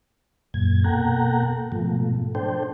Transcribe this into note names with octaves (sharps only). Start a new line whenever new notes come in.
F#2 A#2 G#6
B2 A#3 A4 F#5 G5 A#5
G#2 B2 F3 A3
D4 A4 C5 G5